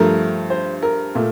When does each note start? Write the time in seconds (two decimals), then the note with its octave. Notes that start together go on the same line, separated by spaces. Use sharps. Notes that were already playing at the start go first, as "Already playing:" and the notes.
Already playing: G2 F3 A3 A#4
0.50 C5
0.83 A#4
1.15 A#2 A3